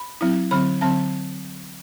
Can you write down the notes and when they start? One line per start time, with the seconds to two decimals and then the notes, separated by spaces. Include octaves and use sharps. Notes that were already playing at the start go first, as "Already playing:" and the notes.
Already playing: B5
0.21 F#3 C4 E4
0.51 D3 F#3 C4 B5
0.81 D3 F#3 C4 A5